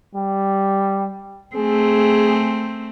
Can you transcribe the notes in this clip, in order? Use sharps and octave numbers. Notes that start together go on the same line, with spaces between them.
G3
A3 C4 G#4